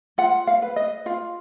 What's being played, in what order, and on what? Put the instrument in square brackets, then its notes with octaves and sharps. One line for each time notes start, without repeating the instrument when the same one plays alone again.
[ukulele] F4 F#5
F5
B4
D#5
F4 F5